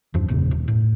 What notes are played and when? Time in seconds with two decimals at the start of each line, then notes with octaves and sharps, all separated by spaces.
0.14 E2 G2 F3
0.28 F#1 E2 A#2 C#3
0.51 D#1
0.68 A2